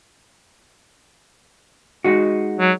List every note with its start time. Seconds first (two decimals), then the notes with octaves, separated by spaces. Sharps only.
2.04 G#3 D#4 F#4
2.60 F#3